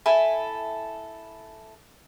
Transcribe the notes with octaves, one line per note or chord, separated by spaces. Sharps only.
E4 A4 G#5